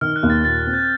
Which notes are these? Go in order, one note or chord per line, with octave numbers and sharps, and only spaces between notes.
D#3 F6
F#6
D#2
A6
A#2 A6
C4
G6